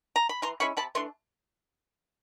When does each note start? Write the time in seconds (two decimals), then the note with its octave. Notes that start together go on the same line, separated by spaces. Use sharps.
0.16 A#5
0.29 B5
0.42 E3 A#5 C6
0.60 G#3 C#4 E4 B5 C#6
0.77 C3 A5 B5
0.95 E3 A3 D4 C6